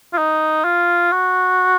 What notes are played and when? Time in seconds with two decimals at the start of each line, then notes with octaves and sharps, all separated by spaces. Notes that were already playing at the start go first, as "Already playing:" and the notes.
0.13 F4
0.18 D#4
0.65 F4
1.13 F#4